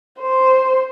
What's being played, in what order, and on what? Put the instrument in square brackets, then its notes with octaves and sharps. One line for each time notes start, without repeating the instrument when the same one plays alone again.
[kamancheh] C5